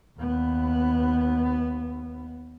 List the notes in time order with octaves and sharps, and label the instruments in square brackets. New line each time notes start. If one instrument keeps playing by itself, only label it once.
[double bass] D#2 B3